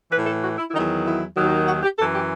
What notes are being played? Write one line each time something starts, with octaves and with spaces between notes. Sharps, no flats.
A2 E3 B4
A4
F#4
E4
E4
E2 D#3 F#3 D#4
E4
D#2 D#3 F#3
F#4
G4
F#2 E3 A4
G4